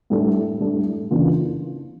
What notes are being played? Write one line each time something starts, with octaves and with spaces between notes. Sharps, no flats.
A2 G3 D4 A4
A2 G3 D4 A4
C#3 E3 A#3 D4 F4